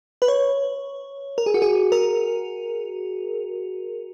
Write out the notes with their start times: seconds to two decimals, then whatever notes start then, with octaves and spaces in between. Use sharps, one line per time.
0.22 B4
0.28 C#5
1.38 A#4
1.46 G#4
1.54 F#4
1.62 G#4
1.92 A#4